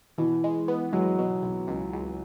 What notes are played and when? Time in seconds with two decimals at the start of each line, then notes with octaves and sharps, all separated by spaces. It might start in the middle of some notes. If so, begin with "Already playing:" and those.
0.18 B2 E3
0.44 G#3
0.68 B3
0.93 F#3 G#3
1.19 B2
1.43 B1
1.67 C#2
1.93 C#2